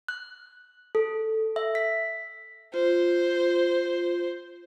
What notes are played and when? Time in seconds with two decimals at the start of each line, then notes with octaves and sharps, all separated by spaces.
0.08 F#6
0.95 A4
1.56 E5
1.75 B6
2.74 F4 C5